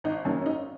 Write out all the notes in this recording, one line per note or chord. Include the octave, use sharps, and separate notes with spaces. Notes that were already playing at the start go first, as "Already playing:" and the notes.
G#1 D#4
F#2 D#3 A#3 C#4
C#4
G#1 D#4